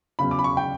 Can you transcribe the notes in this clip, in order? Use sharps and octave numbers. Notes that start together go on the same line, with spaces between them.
E2 C#3 F#3 C#4 B5
D6
B5
C#6
G5